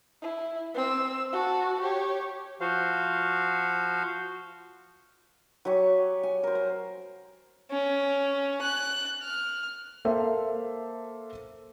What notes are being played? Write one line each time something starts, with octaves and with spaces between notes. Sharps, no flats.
E4
C4 E6
F#4 A5
G4 C#5
F3 F#4 C5 F5
F#3 G4 G#5 C#6
G#5
A#4 C5
C5
C#4
F#6
F6
A#3 A4 C5 E5